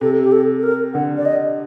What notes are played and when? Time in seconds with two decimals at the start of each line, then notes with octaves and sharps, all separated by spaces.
0.01 C3 A4
0.23 G4
0.32 A4
0.58 A4
0.63 A#4
0.94 D3 F#5
1.17 D5
1.25 D#5